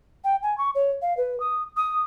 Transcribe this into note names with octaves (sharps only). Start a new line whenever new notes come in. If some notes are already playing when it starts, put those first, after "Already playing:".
G5
G#5
C#6
C#5
F5
B4
D#6
D#6